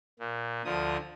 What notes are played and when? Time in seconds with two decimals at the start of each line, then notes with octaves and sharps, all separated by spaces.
0.20 A#2
0.65 D2 D3 F3 D#6